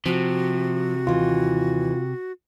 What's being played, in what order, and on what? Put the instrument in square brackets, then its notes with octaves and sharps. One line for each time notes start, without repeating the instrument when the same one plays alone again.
[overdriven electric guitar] C3 [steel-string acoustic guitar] F3 [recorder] F#4
[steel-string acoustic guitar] D#2 E3 [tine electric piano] F4